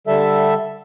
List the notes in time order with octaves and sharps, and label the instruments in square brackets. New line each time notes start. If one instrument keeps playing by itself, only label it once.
[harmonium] D3 G3 A4 E5